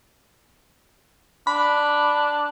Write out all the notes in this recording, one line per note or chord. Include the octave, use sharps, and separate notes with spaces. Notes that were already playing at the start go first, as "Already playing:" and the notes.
D4 B5